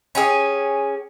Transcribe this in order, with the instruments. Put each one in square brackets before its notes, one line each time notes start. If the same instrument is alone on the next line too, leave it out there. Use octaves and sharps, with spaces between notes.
[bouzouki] C#4 G4 G#4